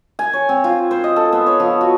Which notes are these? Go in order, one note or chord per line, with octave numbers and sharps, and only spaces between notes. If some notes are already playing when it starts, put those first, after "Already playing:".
G#5
C#5
C4
F4
C5
D#5
A4
B3
C#5
F3
F#4